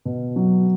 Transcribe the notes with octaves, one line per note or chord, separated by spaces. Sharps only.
B2
F#3